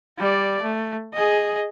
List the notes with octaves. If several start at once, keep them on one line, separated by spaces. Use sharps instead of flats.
G3 D5
A3
G#4 D#5